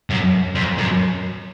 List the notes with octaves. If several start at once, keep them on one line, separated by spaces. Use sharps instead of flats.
F#2
F2
F#2